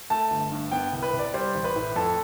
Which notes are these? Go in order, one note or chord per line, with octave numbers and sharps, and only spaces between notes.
A3 A5
G1
G2
B3 G5
C2
B4
C3
D5
G3 C5
A1
B4
A2
F2 A4